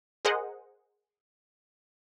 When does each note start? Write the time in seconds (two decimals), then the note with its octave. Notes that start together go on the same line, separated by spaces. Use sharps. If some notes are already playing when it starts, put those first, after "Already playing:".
0.25 G#4 A#4 C5 D#5 F#5